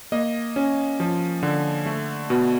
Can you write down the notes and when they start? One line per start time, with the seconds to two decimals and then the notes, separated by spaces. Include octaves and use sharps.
0.12 A#3 D#5
0.56 C#4
1.00 F3
1.43 D3
1.86 A3
2.30 B2